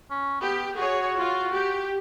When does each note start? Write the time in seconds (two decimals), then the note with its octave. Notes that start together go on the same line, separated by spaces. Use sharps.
0.11 C#4
0.41 B3 G4
0.77 F#4 G#4 C#5
1.18 F4
1.53 G4